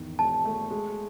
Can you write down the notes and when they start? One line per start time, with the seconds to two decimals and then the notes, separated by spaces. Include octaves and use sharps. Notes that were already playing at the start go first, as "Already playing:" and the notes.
Already playing: G#1 E2 D#3
0.19 E1 A5
0.45 A3
0.70 G#3